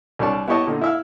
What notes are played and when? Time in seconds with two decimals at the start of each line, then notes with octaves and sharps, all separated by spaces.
0.19 C2 G3 D4 C#5 D5 A5
0.47 B3 E4 G4 C#5 D#5 A5
0.67 A#2 D3 D#4
0.81 E4 E5 F5